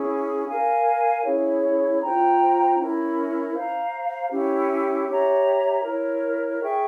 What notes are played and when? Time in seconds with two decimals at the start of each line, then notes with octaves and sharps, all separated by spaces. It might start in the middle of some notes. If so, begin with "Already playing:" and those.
Already playing: C#4 E4 G#4
0.48 A#4 F5 G#5
1.24 C#4 E4 G#4 C#5
2.01 F4 C5 G5 A#5
2.78 C#4 E4 A#4
3.54 C5 F5 A#5
4.31 C#4 E4 G4
5.08 G4 C#5 E5 A#5
5.84 E4 A#4 C#5
6.62 G#4 E5 G5 C#6